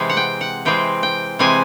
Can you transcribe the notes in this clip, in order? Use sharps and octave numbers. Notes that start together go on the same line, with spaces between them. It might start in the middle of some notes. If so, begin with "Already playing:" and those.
Already playing: C3 E3 G#3 C4
F#5
G5
F#5
C3 E3 G#3 C4 G5
G5
C3 E3 G#3 C4 G#5